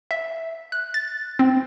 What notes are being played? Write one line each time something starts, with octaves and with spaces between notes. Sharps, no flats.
E5
F#6
A6
C4